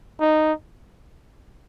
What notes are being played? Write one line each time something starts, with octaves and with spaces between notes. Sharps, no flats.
D#4